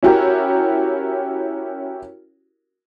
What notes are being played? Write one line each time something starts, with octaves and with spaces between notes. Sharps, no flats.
C#4 E4 F#4 G4 A#4